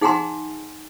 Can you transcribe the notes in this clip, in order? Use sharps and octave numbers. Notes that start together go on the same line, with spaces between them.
D#4 G#4 F#5 G#5 A#5 C6